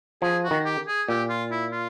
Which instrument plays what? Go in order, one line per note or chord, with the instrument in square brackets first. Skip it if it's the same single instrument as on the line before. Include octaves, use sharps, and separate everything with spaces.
[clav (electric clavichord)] F3 [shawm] G#4
[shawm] F#4
[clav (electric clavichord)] D#3
[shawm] G4
G#4
[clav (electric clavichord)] A#2 [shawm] G4
[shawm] F4
E4
F4